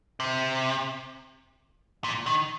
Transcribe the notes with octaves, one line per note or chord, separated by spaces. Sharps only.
C3
A#2
D#3